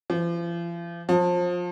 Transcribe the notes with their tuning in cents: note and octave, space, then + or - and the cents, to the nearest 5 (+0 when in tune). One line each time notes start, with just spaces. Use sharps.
F3 -40
F3 +25